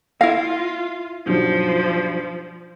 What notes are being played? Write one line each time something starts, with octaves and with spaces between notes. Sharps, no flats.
E4 F4 F5 A#6
B1 G2 F3 F#3